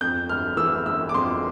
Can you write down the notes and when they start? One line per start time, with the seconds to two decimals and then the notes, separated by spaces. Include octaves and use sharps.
0.01 F2 G6
0.29 G1 F6
0.57 E3 E6
0.86 G1 E6
1.09 D6
1.14 F2 C6